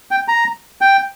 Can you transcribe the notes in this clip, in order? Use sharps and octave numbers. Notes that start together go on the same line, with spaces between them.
G5
A#5
G5